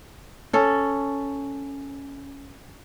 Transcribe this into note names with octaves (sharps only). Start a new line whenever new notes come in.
C#4 A4